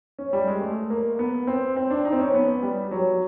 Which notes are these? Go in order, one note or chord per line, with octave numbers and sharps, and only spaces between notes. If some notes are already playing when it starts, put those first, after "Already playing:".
C#4
G3
G#3
A3
A#3
B3
C4
C4
D4
D#4
C4
C#4
B3
G3
F#3